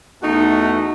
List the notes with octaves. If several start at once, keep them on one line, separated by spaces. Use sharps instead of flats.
E2 A3 D#4 F#4